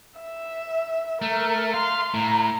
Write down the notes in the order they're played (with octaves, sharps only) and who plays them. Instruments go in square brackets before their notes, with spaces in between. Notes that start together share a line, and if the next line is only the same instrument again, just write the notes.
[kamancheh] E5
[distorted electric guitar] A3 [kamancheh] A#4
[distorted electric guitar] F5 [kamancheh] C6
[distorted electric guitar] A2 [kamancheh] A#5